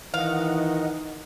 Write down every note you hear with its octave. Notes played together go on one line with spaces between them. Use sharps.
D#3 E3 D#5 F5 F#5